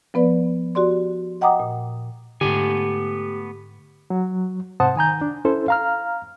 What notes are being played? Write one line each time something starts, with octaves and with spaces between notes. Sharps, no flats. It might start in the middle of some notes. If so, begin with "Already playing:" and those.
F3 B3 B4 D5
F#4 G4 D5 C6
D#5 F#5 G5 A#5 D6 D#6
A#2
G#2 D3 A3 B3 G4 G#5
F#3
G#2 C3 C5 F#5 A5 D#6
D#3 G#5 A#5 G6
D4
C#4 E4 A4 C5
F5 A#5 F6